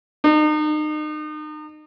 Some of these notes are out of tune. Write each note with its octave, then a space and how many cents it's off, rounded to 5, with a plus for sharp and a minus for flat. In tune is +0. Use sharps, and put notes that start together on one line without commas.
D#4 -35